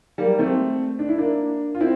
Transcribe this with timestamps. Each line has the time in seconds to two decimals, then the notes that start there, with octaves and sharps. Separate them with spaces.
0.18 G3 A#3
0.39 A3 C4
0.99 D4
1.09 E4
1.18 A#3 D4
1.75 F4
1.81 C4 E4